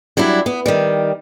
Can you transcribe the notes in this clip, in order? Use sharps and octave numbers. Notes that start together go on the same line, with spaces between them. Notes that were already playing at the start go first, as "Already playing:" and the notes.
F#3 G3 D4 E4
B3
D#3 G3